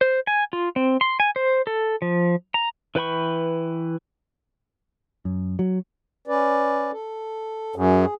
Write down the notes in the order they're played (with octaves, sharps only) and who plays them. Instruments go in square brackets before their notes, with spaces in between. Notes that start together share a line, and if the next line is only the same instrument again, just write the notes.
[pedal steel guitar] C5
G#5
F4
C4
C6
G#5
C5
A4
F3
A#5
E3 B4 G5 B5 C#6
[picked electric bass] F#2
F#3
[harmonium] C#4 B4 D5
A4
[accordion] F#2 [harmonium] G#4